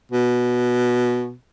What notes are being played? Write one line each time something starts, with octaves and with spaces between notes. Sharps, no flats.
B2